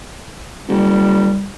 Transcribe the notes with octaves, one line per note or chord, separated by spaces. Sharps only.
F#1 G3